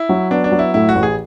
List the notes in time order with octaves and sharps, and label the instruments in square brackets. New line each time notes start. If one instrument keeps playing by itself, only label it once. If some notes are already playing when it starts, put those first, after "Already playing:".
Already playing: [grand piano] E4
[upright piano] F#3
[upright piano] B3 [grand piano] D4
[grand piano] D4
[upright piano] F#3
[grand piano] E4
[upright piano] A2 [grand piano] E4
[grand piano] F#4
[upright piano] A1
[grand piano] G#4